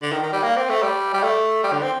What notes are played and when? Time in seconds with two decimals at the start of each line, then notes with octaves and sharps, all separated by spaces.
0.02 D3
0.12 D#3
0.23 D#3
0.32 G3
0.43 A#3
0.57 C4
0.69 A3
0.82 G3
1.14 G3
1.23 A3
1.64 G3
1.72 D3
1.83 C4